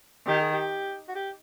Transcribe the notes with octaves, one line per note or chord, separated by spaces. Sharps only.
D#3 G4
G#4
G4
F#4
G4